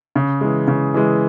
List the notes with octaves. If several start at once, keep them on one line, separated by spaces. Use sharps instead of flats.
C#3
E3 G#3
C#3
E3 G#3